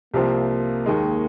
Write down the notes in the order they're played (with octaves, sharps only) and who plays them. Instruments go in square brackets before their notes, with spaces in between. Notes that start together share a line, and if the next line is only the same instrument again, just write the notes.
[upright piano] C2 C3 F3 C4 [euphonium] A#3
[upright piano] D#2 D#3 G#3